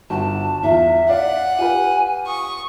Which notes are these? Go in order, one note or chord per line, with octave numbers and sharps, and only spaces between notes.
G1 F#4 A5
E2 F4 E5
D5 F5 F#5
F4 G4 B4 G#5
C#6 D#6